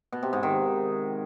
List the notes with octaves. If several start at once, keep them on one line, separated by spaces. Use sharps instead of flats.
B2
C3
G#2
D#3